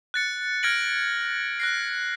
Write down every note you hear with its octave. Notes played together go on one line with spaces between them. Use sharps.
F#6 A6 C#7
F6 G#6 A#6 D7 F#7
F#6 A#6 C7